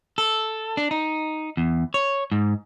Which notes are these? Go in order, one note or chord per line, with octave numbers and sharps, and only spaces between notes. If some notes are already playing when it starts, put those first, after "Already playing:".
A4
D4
D#4
E2
C#5
G#2